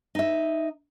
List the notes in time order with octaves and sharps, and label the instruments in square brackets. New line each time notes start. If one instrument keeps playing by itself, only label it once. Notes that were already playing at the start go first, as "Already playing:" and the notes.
[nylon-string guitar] D#4 E5